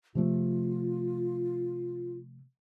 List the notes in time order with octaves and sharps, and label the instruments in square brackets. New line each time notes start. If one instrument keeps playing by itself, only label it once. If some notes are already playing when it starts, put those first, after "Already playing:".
[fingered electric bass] C3 F3 A3 [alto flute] F4